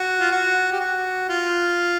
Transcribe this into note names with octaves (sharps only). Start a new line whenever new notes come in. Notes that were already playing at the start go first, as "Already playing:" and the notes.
Already playing: F#4
F4
F#4
G4
F#4
F4